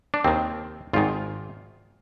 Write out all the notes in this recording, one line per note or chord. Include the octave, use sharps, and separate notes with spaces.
D4
D#2 D#3 C4
G#1 G#2 D#3 F4